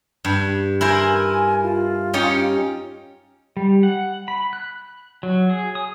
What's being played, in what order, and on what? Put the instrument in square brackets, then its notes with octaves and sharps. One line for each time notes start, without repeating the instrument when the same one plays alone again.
[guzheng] G2
[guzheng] E4 A#4 C5 [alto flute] G#5
[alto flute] F4
[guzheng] C#4 D#4 G4
[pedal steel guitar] G3
F#5
B5
F#6
F#3
G#4
D#6